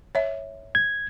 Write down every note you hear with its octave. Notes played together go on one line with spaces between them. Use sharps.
C#5 E5
G#6